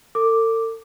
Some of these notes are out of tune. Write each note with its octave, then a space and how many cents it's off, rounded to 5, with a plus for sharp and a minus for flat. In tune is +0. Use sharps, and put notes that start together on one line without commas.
A4 +45 D6 +0